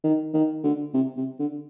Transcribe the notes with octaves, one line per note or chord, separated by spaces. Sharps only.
D#3
D#3
D3
C3
C3
D3